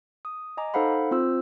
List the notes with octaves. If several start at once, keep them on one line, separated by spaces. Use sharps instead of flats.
D#6
D#5 G#5 A#5 D6
D#4 A4 C5 F5 F#5 B5
C4 F4 C5 E6